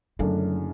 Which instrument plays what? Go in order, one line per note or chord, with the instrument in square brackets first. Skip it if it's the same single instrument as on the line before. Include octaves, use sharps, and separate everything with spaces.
[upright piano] F#1 F#2 D3 A3 D4 [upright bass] F#3